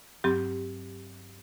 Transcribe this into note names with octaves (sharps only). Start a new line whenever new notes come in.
G2 F#3 C4 G4